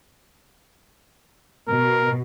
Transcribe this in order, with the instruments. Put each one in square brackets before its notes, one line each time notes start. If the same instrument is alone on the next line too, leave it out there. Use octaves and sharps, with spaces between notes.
[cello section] B2 [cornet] A#4